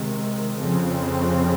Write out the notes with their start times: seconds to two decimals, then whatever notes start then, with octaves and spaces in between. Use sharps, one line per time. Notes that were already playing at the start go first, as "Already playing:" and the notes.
Already playing: C3 D#3 G#3
0.58 F2 C#3 F3 C4